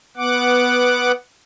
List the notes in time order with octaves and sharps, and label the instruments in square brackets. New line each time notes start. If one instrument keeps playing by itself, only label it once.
[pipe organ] B3 F#5 D6